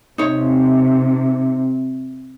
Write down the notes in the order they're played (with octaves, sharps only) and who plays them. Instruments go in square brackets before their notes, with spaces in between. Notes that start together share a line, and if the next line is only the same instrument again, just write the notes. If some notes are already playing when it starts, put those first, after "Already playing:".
[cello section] C3 [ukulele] D#4 C#5